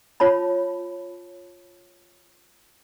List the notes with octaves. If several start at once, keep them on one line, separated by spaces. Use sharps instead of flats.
F4 C#5 A5 B5